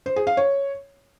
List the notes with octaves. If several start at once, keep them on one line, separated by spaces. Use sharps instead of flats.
C5
G#4
F5
C#5